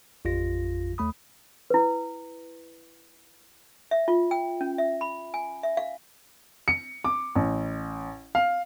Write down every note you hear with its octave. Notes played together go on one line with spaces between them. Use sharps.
A1 F2 F4 A#6
D#2 A3 B5 D#6
E4 B4
E5
F4
G5
C#4
E5
B5
G#5
E5
F5
C#7
D6
A1
F5